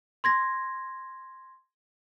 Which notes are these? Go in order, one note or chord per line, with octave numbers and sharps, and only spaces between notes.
C6 G#6 A#6